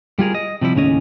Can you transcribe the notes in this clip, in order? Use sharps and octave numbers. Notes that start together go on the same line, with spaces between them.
G3 F4 G#4 A#4
D#5
C3 F3 G3 E4
D#2 A2 C#3 C#4 D#5